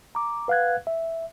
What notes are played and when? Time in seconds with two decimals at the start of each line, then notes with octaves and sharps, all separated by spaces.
0.15 A#5 D6
0.48 B4 F5 F#5 F#6 G#6
0.87 E5